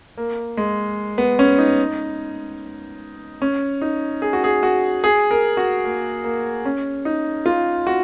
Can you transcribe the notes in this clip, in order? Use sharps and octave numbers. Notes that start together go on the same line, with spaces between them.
A#3
G#3
B3
C#4
D#4
C#4
D#4
G#4
F#4
G#4
F#4
G#4
A#4
F#4
A#3
A#3
C#4
D#4
F4
F#4